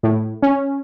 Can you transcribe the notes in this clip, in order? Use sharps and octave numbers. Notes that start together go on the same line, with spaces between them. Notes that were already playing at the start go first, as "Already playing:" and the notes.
A2
C#4